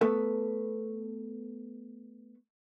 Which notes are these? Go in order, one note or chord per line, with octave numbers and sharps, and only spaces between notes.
A3 B3 A4 B4